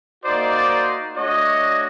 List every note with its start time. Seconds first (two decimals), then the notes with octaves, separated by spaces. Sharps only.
0.23 A#3 D#4 F#4 C5 D5
1.16 A3 D4 F#4 C#5 D#5